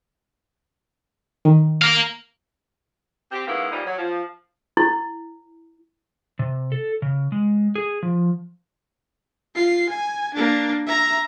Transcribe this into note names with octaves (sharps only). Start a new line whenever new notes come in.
D#3
A#4 F5
C4 G4
G#2 C#3 A#3 B3 E4
E3 F3 G3 A#3 D#4
F#3
F3
E4
C3
A4
C#3
G#3
G#4
F3
F4 C7
G#5
A#3 D4
E5 A#5